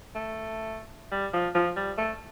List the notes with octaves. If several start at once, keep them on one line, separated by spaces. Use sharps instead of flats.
A3
G3
F3
F3
G3
A3